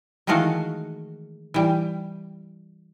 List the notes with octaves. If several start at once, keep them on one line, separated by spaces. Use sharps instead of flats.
D#3 E3 G#3 A3 F#4 F5
E3 G3